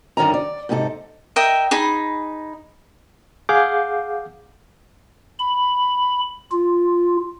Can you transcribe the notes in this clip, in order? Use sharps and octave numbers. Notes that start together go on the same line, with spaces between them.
F#2 D3 D#3 C#4 A#5
D5
G#2 C3 D#4 G4 A4
A#4 D#5 E5 G5
D#4 G#4 B5
G#4 F5 F#5 D6 G6
B5
F4